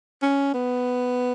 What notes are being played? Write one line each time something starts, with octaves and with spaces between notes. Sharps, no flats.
C#4
B3